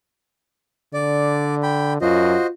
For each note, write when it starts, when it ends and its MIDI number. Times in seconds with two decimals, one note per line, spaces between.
0.94 1.96 50
0.94 1.55 74
1.63 1.93 79
1.63 1.93 83
2.01 2.34 42
2.01 2.51 65
2.01 2.47 66
2.01 2.47 72
2.01 2.47 75